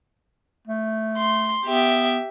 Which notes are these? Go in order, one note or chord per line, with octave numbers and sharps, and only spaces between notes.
A3
C6
B3 G4 E5